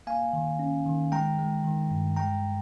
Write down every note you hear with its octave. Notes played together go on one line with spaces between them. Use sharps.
A#3 F5 G#5
D#3
C#4
D#3
G#3 G5 A#5
G#3
D#3
G2
G#3 G5 A#5